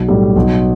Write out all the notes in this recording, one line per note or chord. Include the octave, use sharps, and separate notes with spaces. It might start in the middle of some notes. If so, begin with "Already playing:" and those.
Already playing: B1
A2 G3
B1